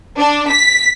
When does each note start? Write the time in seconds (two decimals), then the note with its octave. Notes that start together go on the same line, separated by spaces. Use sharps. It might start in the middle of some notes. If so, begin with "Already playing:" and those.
0.19 D4
0.52 B6